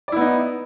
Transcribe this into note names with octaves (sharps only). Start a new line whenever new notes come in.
B3 D#4 E4 D5